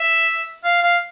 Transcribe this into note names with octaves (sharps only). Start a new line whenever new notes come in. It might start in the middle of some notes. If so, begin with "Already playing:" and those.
Already playing: E5
F5
F5